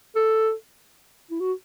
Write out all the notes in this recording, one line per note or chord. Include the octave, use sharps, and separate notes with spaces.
A4
E4
F#4